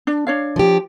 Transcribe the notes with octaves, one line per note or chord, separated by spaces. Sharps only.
D4
D4 C#5 F5
F3 G4